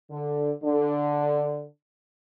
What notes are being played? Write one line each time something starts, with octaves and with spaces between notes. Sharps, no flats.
D3
D3